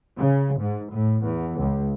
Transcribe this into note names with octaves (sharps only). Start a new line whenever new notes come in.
C#3
G#2
A2
E2
C#2